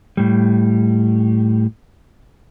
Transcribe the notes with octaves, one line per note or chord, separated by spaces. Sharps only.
A2 G3